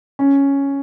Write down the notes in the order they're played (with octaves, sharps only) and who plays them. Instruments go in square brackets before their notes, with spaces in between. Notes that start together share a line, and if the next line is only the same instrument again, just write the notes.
[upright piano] C#4